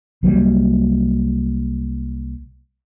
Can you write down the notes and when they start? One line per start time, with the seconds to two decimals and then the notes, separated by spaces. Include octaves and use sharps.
0.23 C2 F#3 G3 A#3